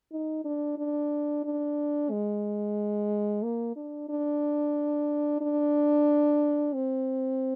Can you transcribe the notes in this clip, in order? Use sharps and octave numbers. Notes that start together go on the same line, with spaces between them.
D#4
D4
D4
D4
G#3
A#3
D4
D4
D4
C4